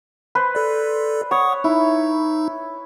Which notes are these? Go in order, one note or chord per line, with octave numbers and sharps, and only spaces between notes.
B4 C5
A4 D5
C#5 F#5 C#6 D#6
D#4 E4